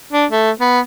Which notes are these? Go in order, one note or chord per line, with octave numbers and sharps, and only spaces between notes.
D4
A3
B3